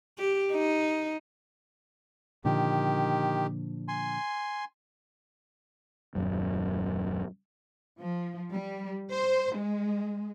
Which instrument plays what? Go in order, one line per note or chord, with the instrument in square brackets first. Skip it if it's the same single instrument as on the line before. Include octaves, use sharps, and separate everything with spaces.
[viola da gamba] G4
D#4
[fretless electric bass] A#2 D3 F3 [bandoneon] D#3 G4
[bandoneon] G#5 C6
[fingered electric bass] D#1 F#2
[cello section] F3
G3
C5
G#3